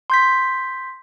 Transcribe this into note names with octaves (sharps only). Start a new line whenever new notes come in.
C6 G6 B6